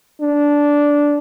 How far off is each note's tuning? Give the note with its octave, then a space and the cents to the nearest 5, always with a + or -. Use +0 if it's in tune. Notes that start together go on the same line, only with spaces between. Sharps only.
D4 -10